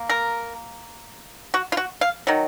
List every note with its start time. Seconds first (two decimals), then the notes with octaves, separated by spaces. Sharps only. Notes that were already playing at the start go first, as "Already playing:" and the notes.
Already playing: A#3
0.09 A#4
1.54 F#4
1.72 F4
1.77 F#4
2.01 F5
2.27 D#3 F#3